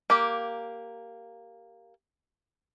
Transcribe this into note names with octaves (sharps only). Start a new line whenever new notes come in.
A#3 G4